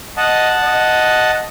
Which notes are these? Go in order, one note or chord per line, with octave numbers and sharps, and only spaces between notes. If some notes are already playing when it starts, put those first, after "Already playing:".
D#5 F#5 A5
D#5